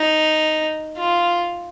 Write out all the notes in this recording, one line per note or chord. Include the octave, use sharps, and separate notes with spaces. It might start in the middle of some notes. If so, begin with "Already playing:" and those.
Already playing: D#4
F4